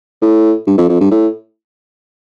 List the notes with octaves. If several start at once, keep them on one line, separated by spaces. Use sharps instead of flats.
A2
G2
F2
F2
G2
A2